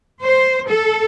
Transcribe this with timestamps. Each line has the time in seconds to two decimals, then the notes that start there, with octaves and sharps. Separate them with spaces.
0.23 C5
0.68 A4